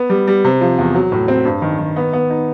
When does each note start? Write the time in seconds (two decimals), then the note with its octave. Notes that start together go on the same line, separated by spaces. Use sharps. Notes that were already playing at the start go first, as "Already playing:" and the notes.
Already playing: B3
0.10 G3
0.27 G3
0.44 C3
0.61 F3
0.78 E2
0.94 F#3
1.12 A2
1.28 C4
1.45 G2
1.62 D#3
1.79 D#3
1.96 B3
2.13 B3
2.30 D#4